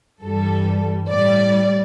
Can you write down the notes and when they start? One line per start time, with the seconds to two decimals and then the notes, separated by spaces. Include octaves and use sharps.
0.23 G2 E3 G3 A4
1.09 A2 G3 D5